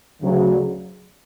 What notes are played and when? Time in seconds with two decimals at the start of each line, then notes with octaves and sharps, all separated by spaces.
0.20 D2 C#3 F#3